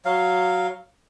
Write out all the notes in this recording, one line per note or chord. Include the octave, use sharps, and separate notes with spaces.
F#3 F5